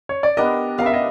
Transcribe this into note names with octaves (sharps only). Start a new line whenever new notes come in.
C#5
D5
B3 D4 G4 A#4 D#5
B3 D4 G4 A#4 F5
E5
D#5